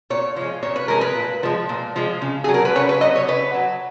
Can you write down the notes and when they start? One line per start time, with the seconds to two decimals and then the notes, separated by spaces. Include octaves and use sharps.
0.10 A#2 C#5
0.36 F3 G#3
0.62 A#2 C#5
0.76 B4
0.88 F3 G#3 A#4
1.01 B4
1.15 A#2
1.43 F3 G#3
1.69 A#2
1.96 F3 G#3
2.22 C#3
2.44 F#3 G#4
2.54 A#4
2.65 B4
2.75 C#3 C#5
2.89 B4
3.01 F#3 D#5
3.15 C#5
3.28 C#3 B4
3.54 F#3